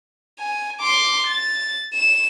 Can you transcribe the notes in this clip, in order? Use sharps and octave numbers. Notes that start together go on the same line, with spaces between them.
G#5
C6 D6
A6
E7